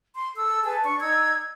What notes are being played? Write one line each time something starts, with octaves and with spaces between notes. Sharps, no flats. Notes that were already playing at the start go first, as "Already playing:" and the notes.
C6
A4 E6
G#4 B4 G#5 A5
D4 C#6
D#4 D5 E6 G#6